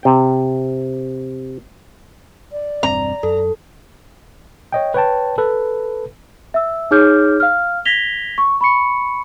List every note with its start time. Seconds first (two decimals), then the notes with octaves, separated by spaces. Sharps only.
0.03 C3 G5
2.52 D5
2.83 E1 G2 C4 A#5
3.23 F#2 A4
4.72 C#5 D#5 G5
4.94 B4 C#5 G5 A5
5.38 A4 B4
6.54 E5 E6
6.91 D#4 G#4 C#5 D6 F6 G6
7.40 F5 F6
7.85 G#6 A#6 B6 F7 G7
8.38 C#6
8.61 B5 C#6 C#7